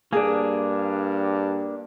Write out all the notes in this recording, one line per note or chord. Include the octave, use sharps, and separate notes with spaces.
G2 A#3 D4 G#4